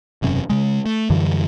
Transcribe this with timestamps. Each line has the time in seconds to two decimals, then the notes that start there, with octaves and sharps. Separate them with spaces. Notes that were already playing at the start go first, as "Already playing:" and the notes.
0.22 E1 F#2 C3 C#4
0.50 C#3 G#3
0.86 A3
1.10 F#2 D3 E3 G3